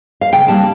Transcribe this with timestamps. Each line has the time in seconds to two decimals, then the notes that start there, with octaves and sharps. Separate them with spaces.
0.21 F5
0.32 C#3 G5
0.48 G3 A#3 D4 A5